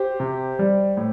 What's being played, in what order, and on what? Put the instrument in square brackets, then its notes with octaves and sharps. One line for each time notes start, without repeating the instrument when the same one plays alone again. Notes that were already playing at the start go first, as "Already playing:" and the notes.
Already playing: [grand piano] G4 C5
C3
G3
A2